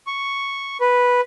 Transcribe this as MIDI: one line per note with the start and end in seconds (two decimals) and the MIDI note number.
0.07 0.77 85
0.81 1.21 71